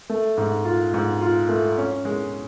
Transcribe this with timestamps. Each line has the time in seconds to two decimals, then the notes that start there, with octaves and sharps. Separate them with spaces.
0.10 A3
0.37 G#2
0.65 F4
0.94 G#2
1.21 F4
1.49 A3
1.78 C#4
2.05 G#3